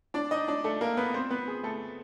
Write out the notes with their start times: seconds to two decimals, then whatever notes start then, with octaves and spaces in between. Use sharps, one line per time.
0.14 D4 D5
0.31 D#4 D#5
0.48 D4 D5
0.64 A3 A4
0.81 A#3 A#4
0.97 B3 B4
1.14 C4 C5
1.31 B3 B4
1.48 G#4
1.63 A3 A4